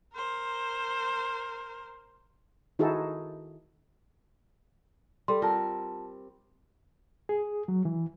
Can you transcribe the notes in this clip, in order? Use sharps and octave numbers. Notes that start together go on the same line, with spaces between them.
A#4 C5
D#3 D#4 E4 F#4 G#4 A4
G3 A4 C6
C4 F4 A#4 A5
G#4
F#3
E3